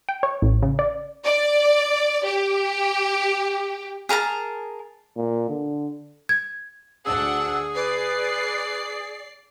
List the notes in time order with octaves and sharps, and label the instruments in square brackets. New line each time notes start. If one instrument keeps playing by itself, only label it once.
[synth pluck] G5
C#5
A1
C#3
D5
[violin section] D5
G4
[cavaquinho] G#4 A#4 A5 A#5
[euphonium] A#2
D3
[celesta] G#6
[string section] D2 D4 F#5 [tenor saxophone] G#4 [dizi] E6
[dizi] B4 [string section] D5 C7